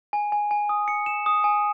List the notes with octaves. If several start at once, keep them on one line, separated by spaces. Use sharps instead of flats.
G#5
G#5
G#5
D#6
C#7
E7
D#6
G#5